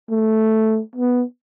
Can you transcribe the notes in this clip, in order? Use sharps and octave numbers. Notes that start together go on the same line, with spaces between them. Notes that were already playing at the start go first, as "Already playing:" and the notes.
A3
B3